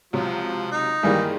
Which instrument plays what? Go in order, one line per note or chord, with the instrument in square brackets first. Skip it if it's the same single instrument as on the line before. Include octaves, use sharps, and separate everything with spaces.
[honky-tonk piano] C#2 C3 F#3 [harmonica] F3
[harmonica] D#4
[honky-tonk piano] G2 D#3 G#3 [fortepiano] E3 G3 A#3